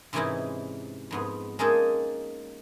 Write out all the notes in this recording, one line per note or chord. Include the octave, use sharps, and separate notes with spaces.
G#2 C3 E3 C#4 D#4 E4
F2 G#2 B3
G#3 A#3 C#4 D#4 G#4 A4